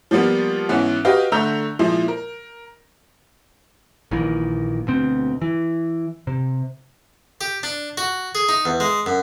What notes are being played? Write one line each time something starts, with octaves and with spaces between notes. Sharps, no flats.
F3 G3 A#3 B3 F4
G#2 E3 B3 C#4
F#4 G4 B4 D#5 F5
D3 A3 A#5 E6 G6 F7
A#2 F3 G#3 E4 C5
A#4
A#1 A#2 D#3 E3
D2 B2 C4
E3
C3
G4
D4
F#4
G#4
D#4
E2
G#3
F#2